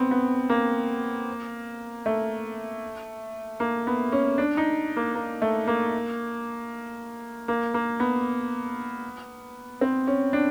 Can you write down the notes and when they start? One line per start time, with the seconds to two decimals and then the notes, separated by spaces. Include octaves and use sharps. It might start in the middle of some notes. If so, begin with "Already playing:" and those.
Already playing: B3 C4
0.11 B3
0.50 A#3
2.06 A3
3.60 A#3
3.87 B3
4.12 C#4
4.38 D4
4.57 D#4
4.97 A#3
5.15 A#3
5.42 A3
5.68 A#3
7.48 A#3
7.74 A#3
8.00 B3
9.81 C4
10.07 C#4
10.33 D4